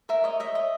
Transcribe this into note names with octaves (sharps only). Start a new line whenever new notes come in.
A#4 E5
C#5 D#5
D#5 E5
D#5